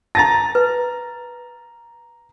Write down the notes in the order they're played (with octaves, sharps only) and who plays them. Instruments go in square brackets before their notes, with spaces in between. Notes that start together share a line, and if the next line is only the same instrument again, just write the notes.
[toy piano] A5 [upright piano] A#5 A6 A#6
[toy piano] B4